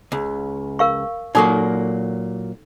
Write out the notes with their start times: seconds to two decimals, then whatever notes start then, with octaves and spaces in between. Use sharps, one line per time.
0.12 C#2
0.79 A#4 F5 C#6
1.35 A#2 F#3 A#3 D#4 A4 C#6